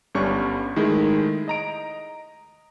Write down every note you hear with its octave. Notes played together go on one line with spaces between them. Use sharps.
G1 G2 G3 C#4 C#6
D#3 G#3 A3 E4
D#5 A#5 D7